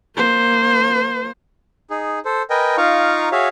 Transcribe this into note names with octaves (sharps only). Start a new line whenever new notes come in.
A#3 C5
D#4 G#4
A4 C5
A#4 B4 D#5 G5 G#5
D#4 F4 F5 A#5 C#6
F#4 G#4 C#5 E5 F5